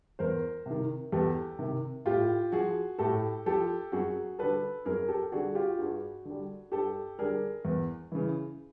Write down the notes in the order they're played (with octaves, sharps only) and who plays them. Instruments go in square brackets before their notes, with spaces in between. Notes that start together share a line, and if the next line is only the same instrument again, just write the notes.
[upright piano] E2 A#4 C5
C3 D#3
E2 G4 A4
C3 D#3
A2 F4 G4
F3 F#4 G#4
A2 G4 A4
F3 G4 A4
F#2 F#4 G#4
D3 G3 A4 B4
F#2 G#4 A#4
G4 A4
D3 G3 F#4 G#4
F4 G4
G2 F#4 G#4
D3 G3
G2 G4 A4
D3 G3 G#4 A#4
E2
C#3 E3